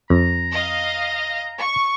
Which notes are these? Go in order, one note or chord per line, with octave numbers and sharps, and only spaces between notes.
F2 A#5
D#5 F5
C#6